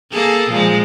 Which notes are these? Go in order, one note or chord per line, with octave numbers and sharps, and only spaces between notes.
A#3 G#4 A4
A#2 F3 G#3